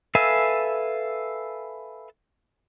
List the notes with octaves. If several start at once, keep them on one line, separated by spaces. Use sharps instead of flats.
A4 B4 E5 F5 G#5